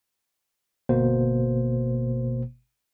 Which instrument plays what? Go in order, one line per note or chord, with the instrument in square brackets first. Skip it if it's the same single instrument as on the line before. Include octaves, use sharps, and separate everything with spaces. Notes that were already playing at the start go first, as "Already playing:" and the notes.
[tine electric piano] G1 B2 A#3 C5